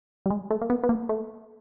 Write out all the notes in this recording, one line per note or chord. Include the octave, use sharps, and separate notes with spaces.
G3
G#3
A3
A#3
B3
B3
A#3
A3